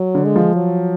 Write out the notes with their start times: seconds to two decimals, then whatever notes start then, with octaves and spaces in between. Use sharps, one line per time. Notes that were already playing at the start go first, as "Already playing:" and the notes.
Already playing: F#3
0.15 D3
0.25 G#3
0.36 F3
0.56 F#3